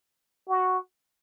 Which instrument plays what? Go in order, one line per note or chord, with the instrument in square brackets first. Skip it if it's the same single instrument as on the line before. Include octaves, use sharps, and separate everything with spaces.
[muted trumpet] F#4